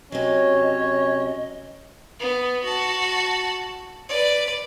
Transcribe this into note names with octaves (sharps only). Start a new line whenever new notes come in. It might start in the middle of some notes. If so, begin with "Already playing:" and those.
C3 F#3 C#4 C#5 D#5
B3
F#4 A5
B4 D5